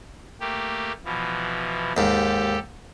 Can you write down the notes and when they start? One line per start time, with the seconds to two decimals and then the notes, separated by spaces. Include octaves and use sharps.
0.40 A3 A#3 G4
1.05 B2 E3 F3
1.97 D#2 G#2 G4 A4